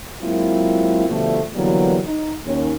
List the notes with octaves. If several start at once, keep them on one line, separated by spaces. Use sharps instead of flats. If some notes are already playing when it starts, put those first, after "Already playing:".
F#3 G#3 A#3 C4 E4 F4
B2 D3 F3 G3 A3
D3 E3 F#3 G3 A#3 B3
D#4
D#2 C#4